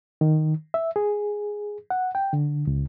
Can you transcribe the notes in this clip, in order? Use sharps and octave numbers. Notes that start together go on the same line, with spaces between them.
D#3
E5
G#4
F#5
G5
D3
C#2